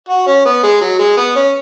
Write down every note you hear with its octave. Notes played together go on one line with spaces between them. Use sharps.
F#4
C#4
B3
G#3
F#3
G#3
B3
C#4